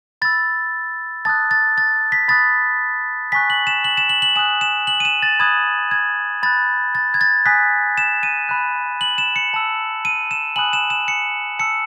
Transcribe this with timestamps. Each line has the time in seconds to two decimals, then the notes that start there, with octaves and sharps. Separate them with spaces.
0.22 B5 E6 A6
1.25 A5 D#6 F#6 A6
1.51 A6
1.78 A6
2.12 B6
2.28 B5 D#6 F#6 A6
3.32 G#5 C#6 F#6 B6
3.50 F#7
3.67 E7
3.84 F#7
3.97 E7
4.09 F#7
4.22 F#7
4.36 G#5 D#6 F#6 E7
4.61 E7
4.87 F#7
5.00 D#7
5.05 E7
5.22 A6
5.39 B5 D#6 F#6 G#6
5.91 G#6
6.43 B5 F#6 A6
6.95 A6
7.14 G#6
7.21 A6
7.45 G#5 D#6 F#6 B6
7.98 E7
8.23 D#7
8.49 B5 F#6
9.01 F#7
9.18 E7
9.36 C#7
9.54 A5 E6
10.05 D#7
10.31 E7
10.56 G#5 B5 D#6 F#6 F#7
10.73 E7
10.90 E7
11.08 C#7
11.59 A5 E6 C#7